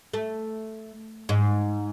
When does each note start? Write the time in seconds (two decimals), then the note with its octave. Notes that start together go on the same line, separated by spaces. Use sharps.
0.13 A3
1.29 G#2